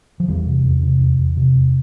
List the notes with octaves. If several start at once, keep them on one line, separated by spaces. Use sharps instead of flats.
F3
E2 E3 G3
C3
E2
C3
E2
E2
C3
E2